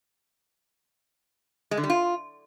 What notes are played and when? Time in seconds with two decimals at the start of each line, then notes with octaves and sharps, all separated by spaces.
1.71 G#3
1.77 D3
1.84 G3
1.90 F4